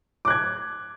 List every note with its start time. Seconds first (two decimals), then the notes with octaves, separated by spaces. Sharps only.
0.25 D6
0.28 F#6
0.30 G#6